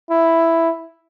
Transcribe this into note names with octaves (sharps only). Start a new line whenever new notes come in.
E4